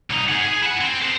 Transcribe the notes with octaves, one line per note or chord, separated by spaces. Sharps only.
C2 D#4
G#4 F#5
G#4
E4 F#5
C4
A4 C5